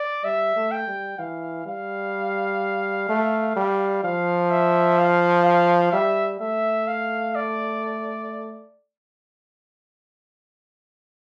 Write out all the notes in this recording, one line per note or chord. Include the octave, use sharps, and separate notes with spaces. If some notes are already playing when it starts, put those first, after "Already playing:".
Already playing: D5
G3 E5
A3
G5
G3
E3 F5
G3 F5
A3
G3
F3 F5
E5
F5
F5
G3 E5
A3 E5
F5
D5